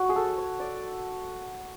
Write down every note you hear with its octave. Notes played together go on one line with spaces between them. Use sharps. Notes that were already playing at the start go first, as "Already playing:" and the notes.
Already playing: F#4 C#5
G#4
A4
C#5
D5